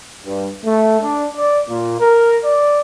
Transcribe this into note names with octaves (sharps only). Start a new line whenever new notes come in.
G2
A3
D4
D5
A#2
A#4
D5